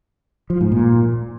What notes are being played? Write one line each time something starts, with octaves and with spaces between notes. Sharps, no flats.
F3
G#2
A#2